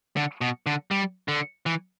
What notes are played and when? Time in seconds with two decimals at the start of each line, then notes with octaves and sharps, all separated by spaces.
0.16 D3
0.41 B2
0.66 D3
0.91 G3
1.28 D3
1.66 E3